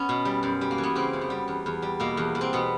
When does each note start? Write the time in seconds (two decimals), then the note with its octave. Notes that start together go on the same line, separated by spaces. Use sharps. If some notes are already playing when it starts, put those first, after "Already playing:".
Already playing: B3 C#4
0.09 B2
0.25 G3
0.43 F#2
0.61 G3
0.71 A#3
0.78 E3
0.83 B3
0.95 C#3 A#3 C4
1.13 F#2
1.21 B3
1.30 G3
1.48 E2
1.66 E2
1.82 G3
2.00 B2 A#3
2.17 E2
2.35 E2
2.41 C4
2.53 B2 B3